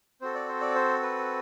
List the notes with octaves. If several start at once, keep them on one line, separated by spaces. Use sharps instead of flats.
C4 F#4 A4 C5
D5
C5
D5
C5
B4